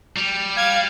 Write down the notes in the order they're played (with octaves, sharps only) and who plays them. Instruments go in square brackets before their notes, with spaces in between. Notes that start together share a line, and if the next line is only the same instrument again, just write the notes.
[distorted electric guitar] G3
[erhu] F5 [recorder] G#6